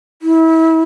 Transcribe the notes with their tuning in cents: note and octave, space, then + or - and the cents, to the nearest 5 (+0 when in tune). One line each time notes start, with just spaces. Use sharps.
E4 -30